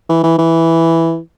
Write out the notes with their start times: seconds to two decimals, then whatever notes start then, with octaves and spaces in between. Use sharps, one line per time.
0.09 E3
0.24 E3
0.38 E3